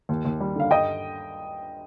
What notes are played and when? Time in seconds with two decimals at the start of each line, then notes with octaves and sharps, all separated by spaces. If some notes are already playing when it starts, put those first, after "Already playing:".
0.09 D#2
0.25 D#2
0.40 G3
0.56 D3 F5
0.71 G2 D#5 G5